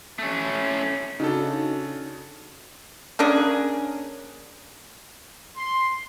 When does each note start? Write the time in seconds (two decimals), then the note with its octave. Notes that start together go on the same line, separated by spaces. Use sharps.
0.19 A3 C#4
1.20 C#3 D4 D#4 F#4 A4
3.19 A#3 C#4 D4 G#4
5.57 C6